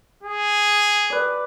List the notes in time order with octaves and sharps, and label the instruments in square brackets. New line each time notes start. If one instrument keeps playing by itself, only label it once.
[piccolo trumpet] G#4
[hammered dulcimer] B4 D5